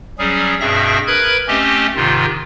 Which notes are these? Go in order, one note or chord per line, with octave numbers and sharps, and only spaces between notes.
F#3 G3 C#4 G#4
G2 B2 C4 G#4 E5 A#6
A#4 B4 B5 F#6 G#6
A3 C4 C#4 G4 D#5
G#2 C3 D#3 F4